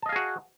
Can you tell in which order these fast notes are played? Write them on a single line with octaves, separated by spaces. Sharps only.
A5 D#5 F5 G#4 F#4